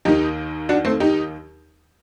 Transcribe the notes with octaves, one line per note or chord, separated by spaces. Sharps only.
D#2 D#3 D#4 G4
D4 F#4
A3 C4
D#4 G4